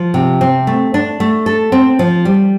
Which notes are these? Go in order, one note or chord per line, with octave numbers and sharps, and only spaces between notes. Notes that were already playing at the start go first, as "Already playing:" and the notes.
Already playing: F3
C3
C4
A3
D4
A3
A4
C4
F3
G3